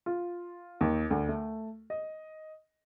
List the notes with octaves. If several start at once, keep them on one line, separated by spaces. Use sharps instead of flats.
F4
D#2
D2
A3
D#5